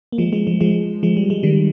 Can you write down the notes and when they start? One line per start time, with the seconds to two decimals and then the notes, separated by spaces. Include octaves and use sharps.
0.12 A#3
0.18 F3 G#3
0.33 F3 G#3
0.47 F3 G#3
0.61 F3 G#3
1.03 F3 G#3
1.17 G3
1.30 G#3
1.43 D#3 G3